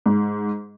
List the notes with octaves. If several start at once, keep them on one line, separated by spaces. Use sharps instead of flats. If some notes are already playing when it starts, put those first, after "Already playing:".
G#2